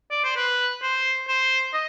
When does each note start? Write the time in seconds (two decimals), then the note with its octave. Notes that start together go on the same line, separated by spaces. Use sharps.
0.11 D5
0.24 C5
0.37 B4
0.82 C5
1.28 C5
1.73 D#5